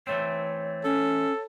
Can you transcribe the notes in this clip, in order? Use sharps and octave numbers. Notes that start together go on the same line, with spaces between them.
E3 A3 C4 C#5
C#4 A4